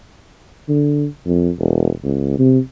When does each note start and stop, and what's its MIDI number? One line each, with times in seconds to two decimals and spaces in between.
0.69 1.06 50
1.26 1.50 41
1.59 1.90 28
2.04 2.36 37
2.39 2.59 48